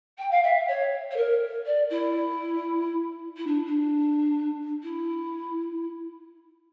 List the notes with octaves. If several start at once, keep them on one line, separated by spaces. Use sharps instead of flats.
G5
F5
E5
C#5
C#5
A#4
D5
E4
E4
D4
D4
E4